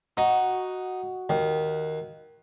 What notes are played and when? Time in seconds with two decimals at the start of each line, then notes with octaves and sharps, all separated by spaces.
0.17 D#4 F#4
1.29 D#2